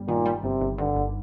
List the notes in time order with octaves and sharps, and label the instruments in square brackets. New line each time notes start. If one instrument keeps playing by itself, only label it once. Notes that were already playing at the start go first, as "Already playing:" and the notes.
Already playing: [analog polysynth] G1 G3
[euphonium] A#2 [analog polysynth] D#3
[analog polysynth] G3
[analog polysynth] G1 [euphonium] C3
[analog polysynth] G1
[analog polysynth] G2 [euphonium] D3
[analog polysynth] G1